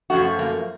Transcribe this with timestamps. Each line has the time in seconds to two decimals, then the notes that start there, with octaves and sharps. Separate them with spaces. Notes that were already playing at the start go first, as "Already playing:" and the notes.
0.10 F#2 F3 A3 F#4
0.39 A#3